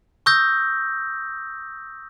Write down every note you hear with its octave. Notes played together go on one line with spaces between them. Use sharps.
C#6 D#6 E6 G6 A#6